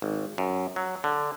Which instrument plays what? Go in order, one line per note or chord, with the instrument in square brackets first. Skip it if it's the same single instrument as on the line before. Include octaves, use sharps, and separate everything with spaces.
[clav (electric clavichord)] G#1
F#2
F#3
D3